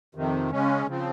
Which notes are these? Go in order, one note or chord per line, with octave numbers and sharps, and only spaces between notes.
F2 C3 D#3
C#3 G#3 C#4
C#3 F3 C4